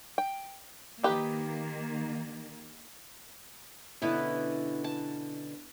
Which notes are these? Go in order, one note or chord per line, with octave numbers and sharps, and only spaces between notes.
G5
D#3 A#3 D#4 G4 B4
B2 D3 B3 C#4 E4
A5